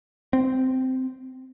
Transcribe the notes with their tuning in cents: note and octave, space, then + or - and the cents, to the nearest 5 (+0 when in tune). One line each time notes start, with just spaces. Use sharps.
C4 -10